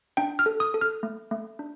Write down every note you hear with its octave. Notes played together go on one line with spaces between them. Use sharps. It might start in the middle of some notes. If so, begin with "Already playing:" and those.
D4 G5
F6
A4
D#6
A4
F6
A3
A3
D4